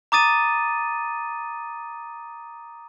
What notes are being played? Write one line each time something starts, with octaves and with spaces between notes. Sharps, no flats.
A#5 D6 D#6 A6 D#7